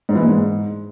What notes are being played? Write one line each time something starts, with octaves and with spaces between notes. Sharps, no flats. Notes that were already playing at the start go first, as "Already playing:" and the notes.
G#2
E3
A#2
G#2